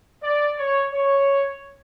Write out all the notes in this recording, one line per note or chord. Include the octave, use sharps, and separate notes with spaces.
D5
C#5
C#5